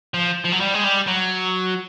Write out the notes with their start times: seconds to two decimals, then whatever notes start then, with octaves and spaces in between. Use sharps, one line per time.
0.14 F3
0.44 F3
0.52 F#3
0.60 G3
0.74 G#3
0.84 G3
1.07 F#3